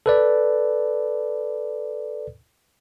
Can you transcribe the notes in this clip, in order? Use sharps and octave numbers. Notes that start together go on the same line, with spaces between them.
A4 B4 D5